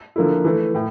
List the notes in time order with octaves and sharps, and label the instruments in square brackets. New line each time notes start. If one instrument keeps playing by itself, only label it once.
[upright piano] D3 F3 A#3 E4
E3 A3 E4
A2